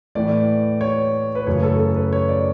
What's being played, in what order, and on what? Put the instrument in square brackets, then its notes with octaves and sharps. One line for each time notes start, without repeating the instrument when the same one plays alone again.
[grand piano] A2 E3 A3 D5
C#5
B4
F#2 C#3 E3 A3 C#5
A4
A4
B4
C#5
D5